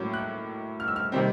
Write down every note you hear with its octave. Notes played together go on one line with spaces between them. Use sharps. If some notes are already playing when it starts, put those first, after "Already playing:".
Already playing: A2 F#3 A#3 C#4 D6
F#6
F6
E6
F6
C3 D#3 G3 C4